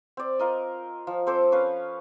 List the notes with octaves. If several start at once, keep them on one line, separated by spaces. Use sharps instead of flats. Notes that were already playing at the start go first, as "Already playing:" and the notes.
C4 D5
F4 A#4 D#5
F3
C4 A4 C5 D6
C#4 B4 F5